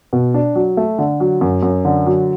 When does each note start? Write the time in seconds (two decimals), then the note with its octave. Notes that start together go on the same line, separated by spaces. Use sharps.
0.13 B2
0.34 D4
0.55 F#3
0.77 A3
0.98 D3
1.20 F#3
1.41 F#2
1.63 F#2
1.85 D3
2.06 F#3